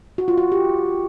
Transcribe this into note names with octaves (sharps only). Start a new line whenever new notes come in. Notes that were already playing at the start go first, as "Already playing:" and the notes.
F#4
F4
F#4
G4